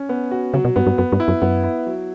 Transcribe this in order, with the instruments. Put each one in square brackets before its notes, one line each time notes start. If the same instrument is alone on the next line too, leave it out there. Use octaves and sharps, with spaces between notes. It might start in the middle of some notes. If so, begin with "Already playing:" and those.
Already playing: [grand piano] C#4
B3
F#4
[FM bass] C#3 [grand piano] F#3
[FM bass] B2
[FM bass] G2 [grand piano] B3
[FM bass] G2
[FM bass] F#2 [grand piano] B3
[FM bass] G2
[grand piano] E4
[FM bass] F#2
[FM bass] F#2 [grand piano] B3
[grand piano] E4
F#3